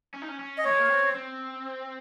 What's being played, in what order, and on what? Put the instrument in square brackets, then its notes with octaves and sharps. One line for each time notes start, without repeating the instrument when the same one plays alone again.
[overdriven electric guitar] C#4
D#4
C#4
C#4
[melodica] D#5
[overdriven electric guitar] A#3 [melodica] C#5
[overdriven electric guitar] G#3
A#3
C4
C4